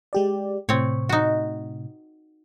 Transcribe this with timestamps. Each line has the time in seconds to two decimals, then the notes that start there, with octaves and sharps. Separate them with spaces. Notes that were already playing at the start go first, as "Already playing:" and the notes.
0.13 G#3 G4 D5
0.69 A2 C3 C4 C#5
1.09 D#4 F#4